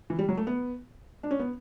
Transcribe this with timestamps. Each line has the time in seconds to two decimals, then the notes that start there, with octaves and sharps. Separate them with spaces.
0.10 E3
0.19 G3
0.29 F#3
0.37 A3
0.47 B3
1.23 D4
1.31 C#4
1.39 B3